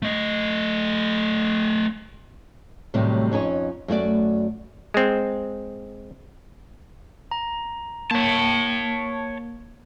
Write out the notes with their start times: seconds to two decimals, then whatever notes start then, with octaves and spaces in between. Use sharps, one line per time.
0.02 A3 D#5
2.94 A2 C3 D#3 F#3 G3 A3
3.32 F2 C#4 D#4 A4 C#5
3.88 F#2 A3 F#4 D5
4.94 G#3 C4
7.31 A#5
8.11 A#3 C#5 A5